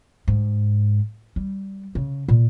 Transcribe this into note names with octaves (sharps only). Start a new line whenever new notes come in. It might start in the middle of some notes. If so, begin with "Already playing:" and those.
G#2
G3
C#3
A#2